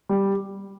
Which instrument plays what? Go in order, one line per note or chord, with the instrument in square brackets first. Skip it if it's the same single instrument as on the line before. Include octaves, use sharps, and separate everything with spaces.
[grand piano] G3